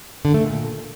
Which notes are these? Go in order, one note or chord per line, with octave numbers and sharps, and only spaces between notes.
D3
A3
A#2